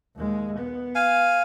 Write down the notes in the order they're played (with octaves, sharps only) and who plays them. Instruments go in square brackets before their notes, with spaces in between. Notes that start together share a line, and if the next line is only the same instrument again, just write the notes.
[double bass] D#2 G#3
B3
[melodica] F5 G#5